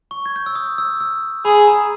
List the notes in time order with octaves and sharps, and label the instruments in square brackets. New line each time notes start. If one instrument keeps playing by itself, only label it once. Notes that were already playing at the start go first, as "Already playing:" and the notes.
[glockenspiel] C#6
G#6
G6
E6
D#6
E6
E6
[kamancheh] G#4 [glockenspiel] B5
[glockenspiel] A#5